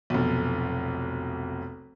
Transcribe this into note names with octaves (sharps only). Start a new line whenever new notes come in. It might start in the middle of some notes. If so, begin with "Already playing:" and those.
F1 B1